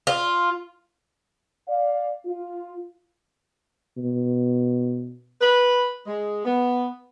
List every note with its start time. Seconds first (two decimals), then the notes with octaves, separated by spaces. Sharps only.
0.07 F4
1.68 D5 F5
2.26 F4
3.98 B2
5.41 B4
6.06 G#3
6.45 B3